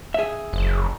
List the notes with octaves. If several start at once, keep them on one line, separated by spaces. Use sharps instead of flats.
G#4 E5
F#1